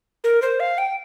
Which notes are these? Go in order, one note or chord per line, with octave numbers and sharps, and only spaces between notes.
A#4
C5
F5
G5